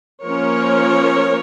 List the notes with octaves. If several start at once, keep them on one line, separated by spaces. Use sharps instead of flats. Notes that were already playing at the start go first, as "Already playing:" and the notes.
F3 A#3 C#4 A#4 C#5